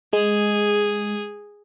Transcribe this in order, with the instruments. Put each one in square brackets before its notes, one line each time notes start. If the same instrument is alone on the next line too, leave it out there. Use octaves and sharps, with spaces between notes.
[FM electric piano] G#3 [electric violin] G#4